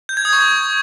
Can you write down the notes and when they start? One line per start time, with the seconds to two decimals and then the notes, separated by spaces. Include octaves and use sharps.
0.09 G6
0.17 G#6
0.25 D#6
0.33 C#6